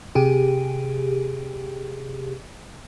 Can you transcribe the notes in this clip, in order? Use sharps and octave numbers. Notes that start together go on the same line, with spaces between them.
C3 G4 G#4